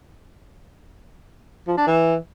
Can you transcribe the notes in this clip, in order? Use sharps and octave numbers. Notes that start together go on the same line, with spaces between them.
F3
D4
E3